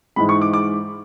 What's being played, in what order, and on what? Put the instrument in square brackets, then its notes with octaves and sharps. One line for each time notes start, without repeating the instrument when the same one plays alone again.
[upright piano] G#2 E3 G#3 B5
C#6
D6
D6